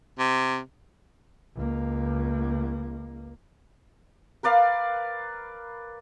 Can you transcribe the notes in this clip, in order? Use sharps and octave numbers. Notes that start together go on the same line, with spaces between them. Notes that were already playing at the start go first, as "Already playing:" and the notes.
C3
C#2 A#3
A#4 B4 D5 F5